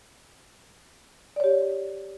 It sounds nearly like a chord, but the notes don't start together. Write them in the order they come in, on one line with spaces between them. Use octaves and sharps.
D5 C#5 G4